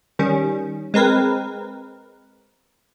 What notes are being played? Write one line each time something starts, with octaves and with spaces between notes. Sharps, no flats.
D#3 G3 C#4
G#3 C4 A#4 B4